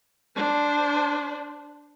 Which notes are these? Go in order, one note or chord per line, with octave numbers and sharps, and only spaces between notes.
D4 C5